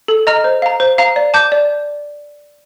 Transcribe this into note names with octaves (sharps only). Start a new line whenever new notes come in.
A4
D#5 A#5 F6
C5
F5 A#5
C5
F5 A#5
D5
A5 D6 G6
D5